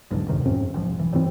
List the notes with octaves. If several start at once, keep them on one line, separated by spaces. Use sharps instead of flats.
B1 E2 G#2 D3
D2 G2 C3 D#3
F2 G#2 C4 C#4
F1 B1 F3
E3
D#1 G2 E3 C4